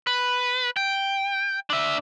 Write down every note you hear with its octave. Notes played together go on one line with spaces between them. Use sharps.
B4
G5
D4 E5